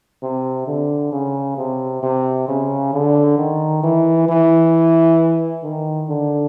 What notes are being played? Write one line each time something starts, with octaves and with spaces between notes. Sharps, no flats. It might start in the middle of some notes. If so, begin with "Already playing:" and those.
C3
D3
C#3
C3
C3
C#3
D3
D#3
E3
E3
D#3
D3